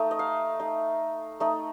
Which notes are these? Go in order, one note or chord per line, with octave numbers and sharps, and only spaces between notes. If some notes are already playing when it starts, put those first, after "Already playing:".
Already playing: A3 D#4
D#5
F5
A3 D#4
A3 D#4